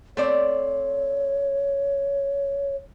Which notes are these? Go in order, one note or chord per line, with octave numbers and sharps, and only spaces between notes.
A3 C4 C#5 D5